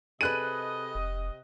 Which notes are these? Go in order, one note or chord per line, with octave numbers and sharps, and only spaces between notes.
C3 G#4 A4 B4 D#5 F#6 D#7
F1